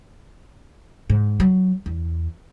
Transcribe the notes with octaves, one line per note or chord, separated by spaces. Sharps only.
G#2
F#3
E2